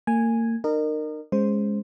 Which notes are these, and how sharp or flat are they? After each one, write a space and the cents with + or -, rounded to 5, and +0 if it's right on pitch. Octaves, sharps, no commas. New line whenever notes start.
A#3 -35 G#5 -5
D#4 -40 A#4 -15 D#5 -35
G#3 +0 C#4 +0 C5 +0